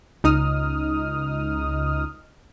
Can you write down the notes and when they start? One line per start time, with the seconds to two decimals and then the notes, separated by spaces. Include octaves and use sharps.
0.24 C#2 D#4 D#6 F6